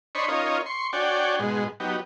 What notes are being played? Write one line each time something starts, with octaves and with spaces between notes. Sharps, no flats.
D4 C5 C#5 D#5 B5 C#6
C#4 D#4 F4 A#4 C#5 D#5
C6 C#6
D4 F#4 C#5 D5 G5 G#5
G#2 B2 G#3
F#3 B3 D#4 G4